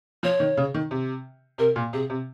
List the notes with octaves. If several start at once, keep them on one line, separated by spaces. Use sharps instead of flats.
F3 C#5
D#3
C#3
D#3
C3
C3 A#4
A#2
C3 G#4
C3